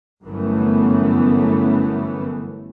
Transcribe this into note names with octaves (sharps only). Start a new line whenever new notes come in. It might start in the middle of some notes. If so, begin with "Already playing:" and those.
G1 F#2 E3 A3 B3 C#4